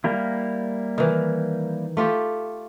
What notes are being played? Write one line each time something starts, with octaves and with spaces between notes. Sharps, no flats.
G3 A#3 E4
D#3 E3
A3 F4 G4